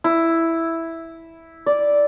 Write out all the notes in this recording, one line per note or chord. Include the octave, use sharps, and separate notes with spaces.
E4
D5